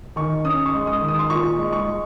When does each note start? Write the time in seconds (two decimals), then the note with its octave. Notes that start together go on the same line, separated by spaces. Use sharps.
0.16 D#3 C#6
0.45 C#4 D#6
0.66 C#6
0.73 G#3
0.87 D#6
1.01 D#3
1.09 D#6
1.19 C6
1.30 A#2 C#6
1.58 G#3
1.73 C#6
1.86 G#3